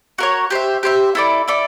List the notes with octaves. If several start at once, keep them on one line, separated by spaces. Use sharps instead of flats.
F#4 A#4 C#5
G4 C5 E5
G4 C5 E5
E4 A4 D5
E4 A4 D5